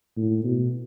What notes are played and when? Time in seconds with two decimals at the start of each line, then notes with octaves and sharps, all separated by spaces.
0.17 A2
0.44 B2